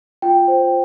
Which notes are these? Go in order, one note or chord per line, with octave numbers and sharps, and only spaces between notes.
F4 G5
C5